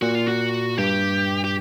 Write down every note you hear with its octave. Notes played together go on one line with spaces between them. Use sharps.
A#2 F#4
F4
F#4
G2 G4
G4